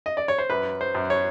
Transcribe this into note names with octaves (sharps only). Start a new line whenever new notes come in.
D#5
D5
C#5
C5
F#2 B4
C5
F#2
C#5